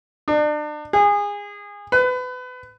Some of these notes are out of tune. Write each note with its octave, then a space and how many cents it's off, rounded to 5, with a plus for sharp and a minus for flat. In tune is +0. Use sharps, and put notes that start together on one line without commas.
D4 +35
G#4 -25
B4 +30